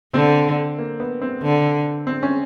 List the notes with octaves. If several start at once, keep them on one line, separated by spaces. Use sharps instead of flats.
D3 C4
A#3
B3
C4
D3
C4
C#4